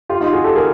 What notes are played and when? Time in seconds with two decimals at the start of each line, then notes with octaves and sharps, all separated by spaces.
0.09 F4 G4
0.21 D#4 F4
0.33 F#4 G#4
0.44 G4 A4
0.55 G#4 A#4